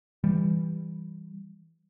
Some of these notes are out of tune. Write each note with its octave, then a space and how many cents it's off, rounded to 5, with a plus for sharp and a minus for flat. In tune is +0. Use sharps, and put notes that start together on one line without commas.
E3 +0 G3 +0